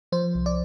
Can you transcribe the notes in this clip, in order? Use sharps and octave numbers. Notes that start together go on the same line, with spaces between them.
F3 C5
C2
D5